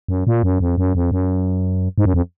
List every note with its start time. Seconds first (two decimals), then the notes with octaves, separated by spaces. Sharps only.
0.08 F#2
0.27 A#2
0.43 F#2
0.60 F2
0.78 F#2
0.95 F2
1.12 F#2
1.98 G#2
2.05 F#2
2.14 F2